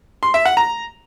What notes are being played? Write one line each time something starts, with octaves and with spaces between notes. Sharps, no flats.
C6
E5
F#5
A#5